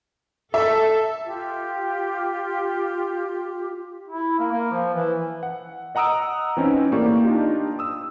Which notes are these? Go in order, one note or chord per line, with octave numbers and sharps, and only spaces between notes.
A4 E5
F4 G4
E4
A#3
A#3
F3
E3
F#5
D#5 F#5 A#5 D#6 E6 D7
E3 C4 C#4 D#4 E4
A2 A#3 G4 D5 C#6
D4 D#4 F4 G4
D#6 E6